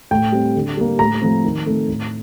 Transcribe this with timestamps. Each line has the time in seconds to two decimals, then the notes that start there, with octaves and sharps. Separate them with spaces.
0.11 A2 G5
0.32 G3 C4
0.55 D3
0.77 G3 A#3
0.99 A2 A#5
1.22 F3 A3 C4
1.44 D#3
1.66 A3 C4
1.88 A2